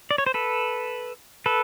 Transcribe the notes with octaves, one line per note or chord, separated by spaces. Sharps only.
D5
C#5
C5
A4 B4
A4 B4